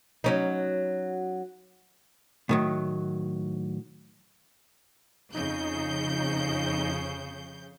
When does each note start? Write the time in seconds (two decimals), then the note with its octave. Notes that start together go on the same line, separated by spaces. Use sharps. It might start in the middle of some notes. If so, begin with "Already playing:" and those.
0.24 F#3 C#4 D#4
2.49 A2 D#3 F#3
5.35 F2 C#3 D#4 G6